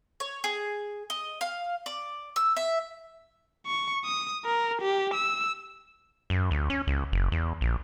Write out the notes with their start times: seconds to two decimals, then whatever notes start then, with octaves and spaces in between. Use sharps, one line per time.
0.20 C#5
0.44 G#4
1.10 D#5
1.41 F5
1.86 D5
2.36 E6
2.57 E5
3.66 C#6
4.05 D#6
4.45 A#4
4.82 G4
5.14 E6
6.30 F#2
6.51 D2
6.70 C#4
6.87 C#2
7.12 F#1
7.32 E2
7.61 A#1